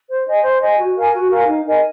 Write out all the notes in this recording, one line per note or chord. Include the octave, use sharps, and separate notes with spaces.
C5
D#5 G#5
C5
D#5 G#5
F#4
A#4 F5 G#5
F#4
A#4 F5 G#5
D#4
A#4 D#5 G#5